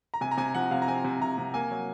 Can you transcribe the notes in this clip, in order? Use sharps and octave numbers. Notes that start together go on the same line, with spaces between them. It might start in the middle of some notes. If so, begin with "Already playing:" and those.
A#5
C3 G#5
A#5
C3 G#5
F3 F#5
C3 F5
A#5
C4 G#5
C3
C3 A#5
C3
A#3 G#5
F#3